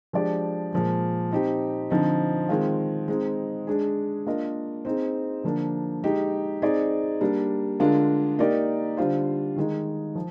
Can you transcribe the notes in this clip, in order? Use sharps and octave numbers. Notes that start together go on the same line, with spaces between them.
F3 G#3 D4 G4 D5
A#2 F3 G#3
C4 D#4 G4
D3 F3 C4 D#4
D#3 G#3 C4 F4
G#3 C4 D#4
G#3 D4 G#4
A#3 D4 F4 A#4 D#5
C4 D#4 G#4
D3 F3 A#3 D4
G#3 D#4 G4
C4 D#4 G#4 D5
G3 A#3 D4
D3 G#3 D4 F4 A#4
A#3 D#4 G4 A#4 D5
D3 G3 D4 F4 C5
D#3 G#3 D#4
F3